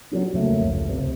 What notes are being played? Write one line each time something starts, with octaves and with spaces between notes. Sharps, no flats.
F#3 G#3 C#4
F2 C#3 A3 A#3
G1 C#2
C#2 C3